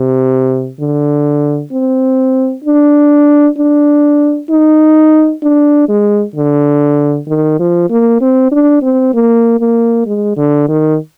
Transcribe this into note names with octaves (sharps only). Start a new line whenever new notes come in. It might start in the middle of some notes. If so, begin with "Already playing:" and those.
Already playing: C3
D3
C4
D4
D4
D#4
D4
G#3
D3
D#3
F3
A#3
C4
D4
C4
A#3
A#3
G#3
D3
D#3